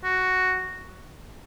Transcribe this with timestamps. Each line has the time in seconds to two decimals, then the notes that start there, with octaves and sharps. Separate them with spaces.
0.04 F#4